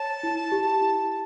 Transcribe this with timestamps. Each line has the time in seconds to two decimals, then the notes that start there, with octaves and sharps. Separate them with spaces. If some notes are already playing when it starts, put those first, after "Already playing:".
Already playing: C#5 A5
0.23 E4
0.52 G4
0.81 E4